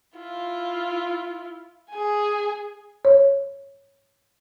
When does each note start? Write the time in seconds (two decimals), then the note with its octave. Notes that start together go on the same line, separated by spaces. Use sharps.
0.18 E4 F4
1.91 G#4 G#5
3.05 C#5